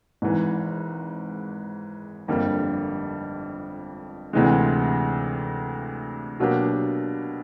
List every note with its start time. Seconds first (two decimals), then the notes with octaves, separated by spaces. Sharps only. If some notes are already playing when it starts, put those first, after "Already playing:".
0.22 G#1 G#2 E3
2.28 G1 F2 D3 G3 A#3
4.33 D2 C3 E3 G#3
6.40 B2 F#3 A#3 D4 G4